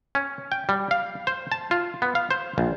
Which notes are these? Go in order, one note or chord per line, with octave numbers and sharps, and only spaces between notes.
C#4
G5
G3
F5
C5
A5
F4
B3
F5
C5
A#1